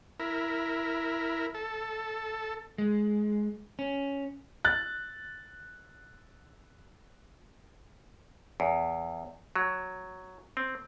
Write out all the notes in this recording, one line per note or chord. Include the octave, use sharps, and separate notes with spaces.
E4 A#4
A4
G#3
C#4
F#6 A6
E2
F#3
C4